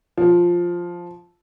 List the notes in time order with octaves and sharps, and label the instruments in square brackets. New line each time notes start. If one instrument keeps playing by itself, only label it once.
[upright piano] F3